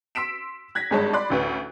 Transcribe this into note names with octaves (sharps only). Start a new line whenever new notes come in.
C6 E6 B6 D7 E7
F#6 G#6 A#6 B6
G#1 G2 G#3 C#5 A5
D5 B5 C6 F#6
A1 D2 B4